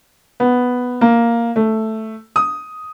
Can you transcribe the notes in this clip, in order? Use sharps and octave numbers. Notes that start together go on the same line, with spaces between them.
B3
A#3
A3
D#6